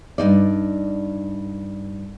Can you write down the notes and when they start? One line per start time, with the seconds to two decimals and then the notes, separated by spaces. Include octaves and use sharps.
0.18 G2 B2 D#4 D5